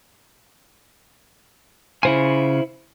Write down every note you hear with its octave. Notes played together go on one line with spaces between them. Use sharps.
C#3 E4 F4 C5 G#5